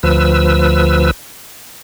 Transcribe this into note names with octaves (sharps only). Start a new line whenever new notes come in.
D2 F3 B4 E6